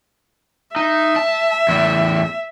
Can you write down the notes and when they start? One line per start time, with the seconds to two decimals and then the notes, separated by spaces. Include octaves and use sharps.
0.76 D#4 E5
1.16 A5
1.69 E2 A2